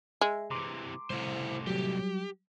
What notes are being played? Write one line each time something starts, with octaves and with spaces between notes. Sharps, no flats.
G#3 E5
C3 E3 A#5 C6 D6
C2 A2 E4 C5
F#3 G3 G4